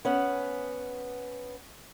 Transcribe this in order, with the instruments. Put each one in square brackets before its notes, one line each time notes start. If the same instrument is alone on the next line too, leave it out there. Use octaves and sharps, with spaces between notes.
[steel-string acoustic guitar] B3 C#4 F#5